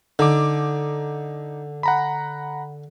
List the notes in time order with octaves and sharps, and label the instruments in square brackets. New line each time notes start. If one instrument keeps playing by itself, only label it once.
[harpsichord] D3 [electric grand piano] D#4 D6
[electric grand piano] F#5 A#5 B5